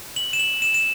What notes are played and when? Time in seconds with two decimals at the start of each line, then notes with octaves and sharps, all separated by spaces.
0.16 F#7
0.33 E7
0.40 F#7
0.62 E7
0.74 E7